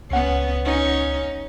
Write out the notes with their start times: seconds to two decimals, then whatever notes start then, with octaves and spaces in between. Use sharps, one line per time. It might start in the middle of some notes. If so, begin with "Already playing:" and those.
0.11 C#2 B3 C#4 F#5
0.65 C#4 D#4